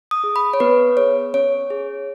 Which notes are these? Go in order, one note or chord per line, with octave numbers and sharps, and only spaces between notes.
D#6
G#4
B5
C#5
B3 B4
G#4 C#5
C#4 C#5
G#4